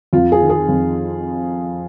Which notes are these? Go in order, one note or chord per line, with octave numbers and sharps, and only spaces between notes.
F2 F4
G#4
D#3
G#4
F2